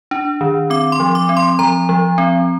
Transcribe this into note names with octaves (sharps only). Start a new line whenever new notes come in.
D4
D#3
C4 D6
C6
F3
D6
C4
C6
F3 A#5
F3
C4